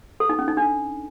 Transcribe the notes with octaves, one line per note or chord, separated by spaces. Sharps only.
A4
D#4
C#4
D#4
D4